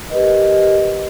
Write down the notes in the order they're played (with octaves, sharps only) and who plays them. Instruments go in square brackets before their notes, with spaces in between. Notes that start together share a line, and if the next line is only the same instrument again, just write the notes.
[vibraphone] G4 A#4 B4 D#5